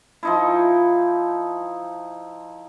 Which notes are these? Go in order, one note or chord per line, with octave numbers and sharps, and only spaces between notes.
F3 D#4 E4